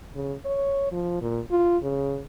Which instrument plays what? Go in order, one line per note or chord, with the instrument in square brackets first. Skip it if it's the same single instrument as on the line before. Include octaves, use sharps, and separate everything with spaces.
[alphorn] C#3
C#5
F3
A#2
F4
C#3